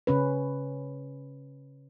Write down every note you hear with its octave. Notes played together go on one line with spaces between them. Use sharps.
C#3 C#4 B4